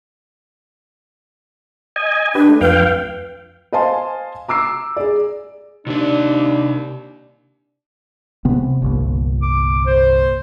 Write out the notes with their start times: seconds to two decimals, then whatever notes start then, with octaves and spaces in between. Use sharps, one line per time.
1.96 D#5 G#5
2.35 D4 G4 B4
2.49 A3
2.61 F2 B4 F5 G5
3.72 C5 D#5 F5 G#5 A5 C6
4.48 A#5 D6 E6 C7
4.96 G#4 D5
5.87 D#2 C3 D4 D5
8.45 C3 B3
8.82 G1 C2 A#2
9.42 D6
9.87 C5